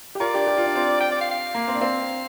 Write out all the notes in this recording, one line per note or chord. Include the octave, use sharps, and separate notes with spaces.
G4
F4 A#4 D5
D4 G4
G4
F4
D4
C4 F4
G5
D5
F5
F5
A#3
C4
D4
C4 F5